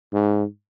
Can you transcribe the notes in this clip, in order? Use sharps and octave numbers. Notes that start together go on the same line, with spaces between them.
G#2